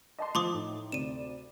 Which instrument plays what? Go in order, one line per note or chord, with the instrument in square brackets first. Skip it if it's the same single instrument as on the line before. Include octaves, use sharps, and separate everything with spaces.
[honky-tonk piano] D#5 A5 C6
[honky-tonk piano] F3 [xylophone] C6 D6 D#6
[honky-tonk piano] A2 D#4
[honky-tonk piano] D2 C3 D5 [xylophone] D#7 E7